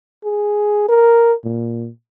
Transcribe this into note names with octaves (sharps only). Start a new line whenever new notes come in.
G#4
A#4
A#2